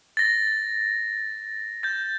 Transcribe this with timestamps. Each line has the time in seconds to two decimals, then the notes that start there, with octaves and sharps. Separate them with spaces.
0.17 A6 A#6
1.83 G6 A6